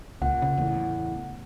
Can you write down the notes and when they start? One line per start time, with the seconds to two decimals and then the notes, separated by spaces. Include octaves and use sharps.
0.22 C#2 A#2 F#5
0.42 C#3
0.57 E2 A2